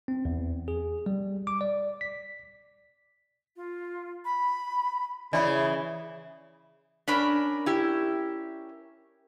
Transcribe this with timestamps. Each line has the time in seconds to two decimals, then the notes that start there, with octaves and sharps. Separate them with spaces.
0.08 C4
0.25 E2
0.68 G#4
1.06 G3
1.47 D6
1.61 D5
2.01 B6
3.56 F4
4.25 B5
5.33 C#3 E3 G#4 D5 E5 B5
7.08 C#4 D4 A#4 B5
7.66 E4 G4